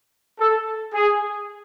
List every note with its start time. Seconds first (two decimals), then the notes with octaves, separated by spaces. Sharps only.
0.39 A4
0.93 G#4